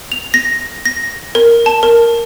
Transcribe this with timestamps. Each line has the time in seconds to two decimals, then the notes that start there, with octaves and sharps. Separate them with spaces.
0.12 F7
0.34 A#6
0.85 A#6
1.35 A#4
1.66 A5
1.83 A#4